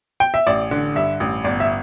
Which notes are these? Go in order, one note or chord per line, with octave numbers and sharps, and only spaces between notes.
G5
E5
A1 D5
D3
G2 E5
A1
G1 D5
E5